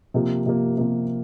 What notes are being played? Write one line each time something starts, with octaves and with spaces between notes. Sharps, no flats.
C3 F3 A#3
C3 F3 A#3
C3 F3 A#3